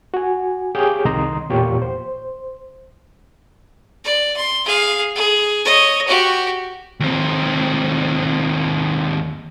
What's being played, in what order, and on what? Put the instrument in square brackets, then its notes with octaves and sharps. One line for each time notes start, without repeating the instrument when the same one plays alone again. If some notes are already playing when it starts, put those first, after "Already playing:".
[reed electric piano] F#4 G#5
G4 G#4 C#5 F5 D6 G6
C2 D#3 D#5 A#5 C6 D#6
E2 A#2 F4 G4 C#5 C#6
C5
[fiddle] D5
C6
G#4 F5
G#4
C#5 D#5
F#4 G4
[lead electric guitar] D#2 C4